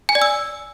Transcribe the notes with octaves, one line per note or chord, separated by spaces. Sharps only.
G#5
D5
E6